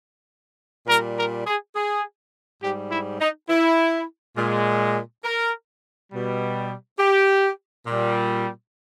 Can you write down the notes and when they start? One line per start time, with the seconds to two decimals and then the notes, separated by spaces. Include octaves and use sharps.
0.87 A#2 G3 A#4
1.16 A#4
1.46 G#4
1.75 G#4
2.62 G#2 G3 G4
2.91 E4
3.20 D#4
3.49 E4
4.37 A#2 G#3
5.24 A#4
6.12 B2 G3
6.98 G4
7.87 A#2 G3